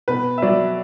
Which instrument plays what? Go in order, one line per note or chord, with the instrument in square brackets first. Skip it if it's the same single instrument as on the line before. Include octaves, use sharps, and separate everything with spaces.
[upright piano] B2 B4
E5
F#3 D5